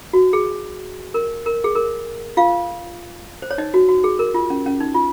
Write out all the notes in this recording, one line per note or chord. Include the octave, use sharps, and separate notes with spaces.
F#4
G#4
A#4
A#4
G#4
A#4
F4 F5
C5
C#5
D#4 D#5
F#4
F#4
G#4
A#4
F4
C#4
C#4
D#4
F4